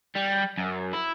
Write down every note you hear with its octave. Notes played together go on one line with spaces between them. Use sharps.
G3
F#2
E4